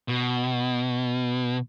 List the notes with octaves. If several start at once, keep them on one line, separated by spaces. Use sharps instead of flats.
B2